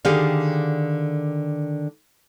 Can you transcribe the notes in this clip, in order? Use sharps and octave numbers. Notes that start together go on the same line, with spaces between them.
D3 D#3 G4 G#4 D5 F5